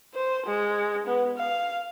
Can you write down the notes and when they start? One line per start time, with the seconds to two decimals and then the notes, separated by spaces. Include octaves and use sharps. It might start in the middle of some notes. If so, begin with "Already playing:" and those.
0.14 C5
0.46 G#3
1.07 B3
1.38 F5